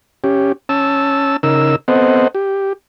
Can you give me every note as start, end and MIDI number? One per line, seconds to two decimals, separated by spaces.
0.24 0.52 61
0.24 0.52 67
0.69 1.37 61
0.69 1.37 81
0.69 1.37 88
1.43 1.76 49
1.43 1.76 63
1.43 1.76 70
1.43 1.76 88
1.88 2.28 59
1.88 2.28 60
1.88 2.28 69
1.88 2.28 72
1.88 2.28 75
1.88 2.28 78
2.35 2.73 67